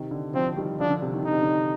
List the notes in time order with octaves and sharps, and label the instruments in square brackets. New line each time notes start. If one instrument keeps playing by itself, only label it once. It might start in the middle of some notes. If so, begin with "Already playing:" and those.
Already playing: [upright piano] C3 D#3
D3
[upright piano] D3 F3 [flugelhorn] C4
[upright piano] D#3 G3
[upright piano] D3 F3 [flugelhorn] D4
[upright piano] D3
C3
D#3
[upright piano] D3 [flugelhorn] D#4
[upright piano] C3
D3